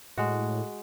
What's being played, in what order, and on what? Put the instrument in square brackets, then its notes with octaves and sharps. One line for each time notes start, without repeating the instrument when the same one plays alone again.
[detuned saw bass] A2 [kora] G#3 F#4